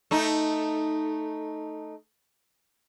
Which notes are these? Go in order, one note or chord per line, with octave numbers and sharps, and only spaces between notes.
A3 D#4